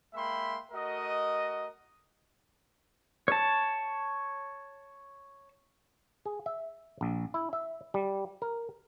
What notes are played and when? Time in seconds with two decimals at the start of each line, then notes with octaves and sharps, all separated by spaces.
0.14 G#3 A#3 E5 G5 B5 C6
0.72 A3 F#4 A#4 D#5
3.28 C#5 A5
6.25 G#4
6.46 E5
7.01 A#1
7.34 E4
7.53 E5
7.94 G3
8.42 A#4